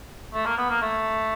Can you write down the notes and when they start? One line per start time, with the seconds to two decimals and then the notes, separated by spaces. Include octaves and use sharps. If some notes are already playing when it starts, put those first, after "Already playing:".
0.34 A3
0.46 A#3
0.58 B3
0.70 A#3
0.82 A3